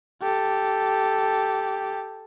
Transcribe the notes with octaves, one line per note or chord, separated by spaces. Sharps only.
G4 A4